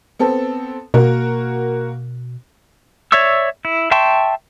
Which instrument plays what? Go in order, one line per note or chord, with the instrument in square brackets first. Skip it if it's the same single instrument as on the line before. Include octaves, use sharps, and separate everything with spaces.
[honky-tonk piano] B3 C4 A4
[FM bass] B2 [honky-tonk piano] A#3 F#4 A#4
[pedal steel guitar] C#5 D5 E5 C#6 E6
E4
E5 G5 A5 C6 C#6